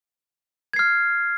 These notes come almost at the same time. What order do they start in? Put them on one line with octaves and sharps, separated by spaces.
G#6 C7 F6